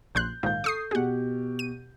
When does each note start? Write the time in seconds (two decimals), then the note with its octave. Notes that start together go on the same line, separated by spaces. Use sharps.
0.15 A#1 C6 F#6 G6
0.43 A#1 G#2 D#3 F5 G6
0.64 A4 C#6 D#6 C7
0.91 B2 G4 G#4 F#5
1.59 D#7